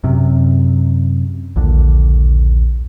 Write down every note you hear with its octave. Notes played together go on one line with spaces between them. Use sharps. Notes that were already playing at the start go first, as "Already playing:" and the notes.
F#2 C3
A#1 D#2 D3